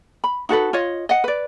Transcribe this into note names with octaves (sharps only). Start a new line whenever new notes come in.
B5
D#4 F#4 A4 B4
F4 C#5 D#5
D#5 F#5
B4 D5